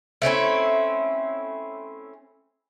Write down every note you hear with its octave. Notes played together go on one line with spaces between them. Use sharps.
A3 C4 C#4 E4